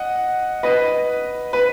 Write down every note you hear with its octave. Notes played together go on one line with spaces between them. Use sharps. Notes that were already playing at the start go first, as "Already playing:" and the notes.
Already playing: D#5 F#5
B4 D#5
B4